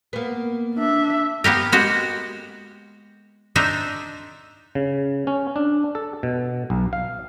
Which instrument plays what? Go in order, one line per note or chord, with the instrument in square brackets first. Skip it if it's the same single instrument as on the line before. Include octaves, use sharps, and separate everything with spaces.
[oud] A#3 B3
[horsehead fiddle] D4 E5
[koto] A#3 B3 G4 A#4
G#3 F#4 G4
D4 D#4 C5 E5
[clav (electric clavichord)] C#3
C#4
D4
A4
B2
B1
F5